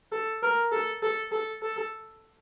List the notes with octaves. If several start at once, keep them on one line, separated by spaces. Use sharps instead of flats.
A4
A#4
A4
A4
A4
A4